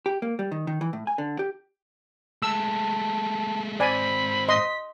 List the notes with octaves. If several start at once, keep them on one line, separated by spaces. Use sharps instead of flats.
G4
A#3
G3
D#3
D#3
E3
A2
G#5
D3
G4
G#3 A3 A5 E6
G#2 C4 C5 D5 G#5 B5
D#5 C6 B6